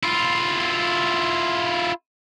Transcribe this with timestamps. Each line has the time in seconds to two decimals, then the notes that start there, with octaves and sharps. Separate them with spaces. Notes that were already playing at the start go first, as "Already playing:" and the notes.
0.03 E4 F4